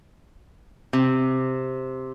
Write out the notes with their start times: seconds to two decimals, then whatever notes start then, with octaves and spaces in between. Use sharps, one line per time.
0.93 C3